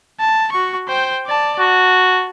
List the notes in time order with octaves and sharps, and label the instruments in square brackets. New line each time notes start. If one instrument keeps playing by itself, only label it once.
[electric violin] A5
F#4 C#6
C5 G5
D5 A5
[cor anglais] F#4 [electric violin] A5